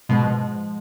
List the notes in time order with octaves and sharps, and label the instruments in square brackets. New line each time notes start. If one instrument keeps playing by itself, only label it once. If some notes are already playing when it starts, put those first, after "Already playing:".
[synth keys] G#2 F3 G#3 [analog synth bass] B2